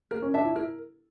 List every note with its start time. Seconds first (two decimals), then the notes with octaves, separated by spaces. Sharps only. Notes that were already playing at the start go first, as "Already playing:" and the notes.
0.11 A#3 A#4
0.22 C#4
0.34 D4 E5 A5
0.45 E4
0.55 E4 A#4